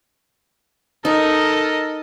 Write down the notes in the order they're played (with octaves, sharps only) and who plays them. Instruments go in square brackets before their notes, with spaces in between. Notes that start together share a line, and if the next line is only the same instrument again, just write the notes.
[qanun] D#4 [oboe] A4 [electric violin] A#4 D#5